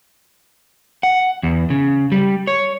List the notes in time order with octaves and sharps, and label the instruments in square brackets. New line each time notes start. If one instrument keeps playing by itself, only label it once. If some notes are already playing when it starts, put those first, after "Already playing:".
[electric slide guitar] F#5
E2
C#3
G3
C#5